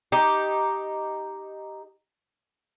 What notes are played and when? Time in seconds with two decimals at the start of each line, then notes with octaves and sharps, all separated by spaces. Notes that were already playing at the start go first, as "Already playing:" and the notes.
0.12 D#4 G4